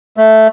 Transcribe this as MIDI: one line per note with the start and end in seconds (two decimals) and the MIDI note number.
0.17 0.48 57